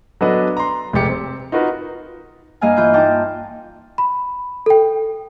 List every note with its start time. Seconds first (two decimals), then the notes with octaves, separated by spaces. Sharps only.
0.21 F#3 B3 D4 A4 B4 D#5
0.57 A#5 C6
0.93 F1 G#3 G4 C#7
1.08 C4
1.52 D#4 F4 F#4 A#4 B4
2.61 G2 A#3 D#5 F5 G#5
2.77 E3 F4 G6
2.94 D#4 G5 A5 D6
3.98 B5
4.66 A4 G5